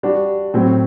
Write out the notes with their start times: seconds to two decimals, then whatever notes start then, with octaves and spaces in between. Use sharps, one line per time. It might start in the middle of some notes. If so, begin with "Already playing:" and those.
0.03 G3 D4 F#4
0.54 A2 F#3 C4